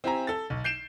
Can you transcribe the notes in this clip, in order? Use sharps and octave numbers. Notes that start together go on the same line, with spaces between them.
C4 E4 G4 E5 G#5 A#5
A4 A6
B1
G6 C7 D7 E7